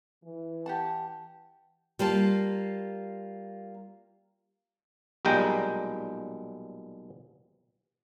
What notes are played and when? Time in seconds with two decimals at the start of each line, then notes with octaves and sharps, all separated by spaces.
0.24 E3
0.66 G4 F#5 A5
1.99 G3 A#3 F4 A5
5.25 B1 A#2 G3 G#3 G5 A#5